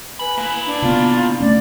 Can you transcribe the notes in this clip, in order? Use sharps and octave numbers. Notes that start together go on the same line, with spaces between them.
B4 G#5 B5
A#3 E4
D4
C3 B3 F4
A3 C#4 D5